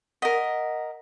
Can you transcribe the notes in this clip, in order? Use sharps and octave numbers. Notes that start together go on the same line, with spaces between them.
A#4 D#5 F#5 A#6 B6